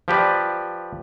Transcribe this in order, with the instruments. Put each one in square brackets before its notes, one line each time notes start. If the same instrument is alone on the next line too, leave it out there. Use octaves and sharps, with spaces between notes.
[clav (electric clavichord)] F3 G4 B4 D5